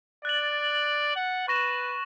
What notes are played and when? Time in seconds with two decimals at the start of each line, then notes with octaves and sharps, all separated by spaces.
0.25 D5 F#6 A6 F#7
1.16 F#5
1.48 B4 C#6 A#6 E7